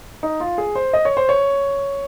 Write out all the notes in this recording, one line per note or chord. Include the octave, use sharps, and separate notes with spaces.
D#4
F4
G#4
C5
D#5
C#5
C5
C#5